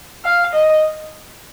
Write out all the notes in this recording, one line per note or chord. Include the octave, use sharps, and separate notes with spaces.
F5
D#5